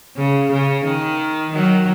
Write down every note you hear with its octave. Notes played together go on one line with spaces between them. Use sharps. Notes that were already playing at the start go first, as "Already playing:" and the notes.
C#3
C#3
D#3
D#3 F#3